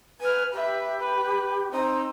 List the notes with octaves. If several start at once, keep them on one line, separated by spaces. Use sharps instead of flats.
B4 G#5 F6
G4 B4 E5
B4
C4 D#4